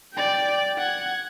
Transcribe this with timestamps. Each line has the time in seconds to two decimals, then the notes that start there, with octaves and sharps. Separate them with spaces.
0.14 D5 G5
0.78 F#5 G#6